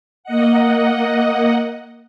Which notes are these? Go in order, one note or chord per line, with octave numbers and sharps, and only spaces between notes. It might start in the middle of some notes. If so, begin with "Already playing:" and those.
A#3 D#5 F#5